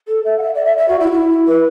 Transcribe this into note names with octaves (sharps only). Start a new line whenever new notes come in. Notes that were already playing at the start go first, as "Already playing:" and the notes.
A4
E5
F#5
E5
D5
E5
E5
F#4
E4
E4
B4